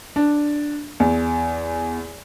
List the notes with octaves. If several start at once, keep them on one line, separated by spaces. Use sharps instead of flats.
D4
E2